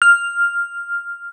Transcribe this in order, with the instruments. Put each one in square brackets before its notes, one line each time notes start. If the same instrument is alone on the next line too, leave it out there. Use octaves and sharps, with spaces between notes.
[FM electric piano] F6